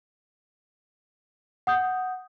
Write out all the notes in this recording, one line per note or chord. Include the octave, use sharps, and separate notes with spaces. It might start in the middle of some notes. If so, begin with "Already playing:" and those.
F#5 D#6 G6